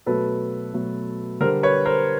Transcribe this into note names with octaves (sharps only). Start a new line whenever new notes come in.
B2 F#3 A3 A4 B4
B2 F#3 A3
D3 G3 A#4 C5
B4 C#5
A#4 C5